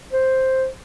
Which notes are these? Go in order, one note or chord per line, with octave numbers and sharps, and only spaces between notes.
C5